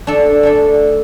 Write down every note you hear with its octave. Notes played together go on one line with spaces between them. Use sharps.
A3 D4 A4
A3 D4 A4